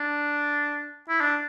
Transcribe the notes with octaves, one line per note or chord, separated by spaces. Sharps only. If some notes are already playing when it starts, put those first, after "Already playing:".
Already playing: D4
E4
D4